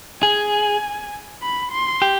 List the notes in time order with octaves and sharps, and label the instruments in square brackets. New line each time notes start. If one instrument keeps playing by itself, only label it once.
[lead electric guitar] G#4 [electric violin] G#5
[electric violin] B5
C6
[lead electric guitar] G4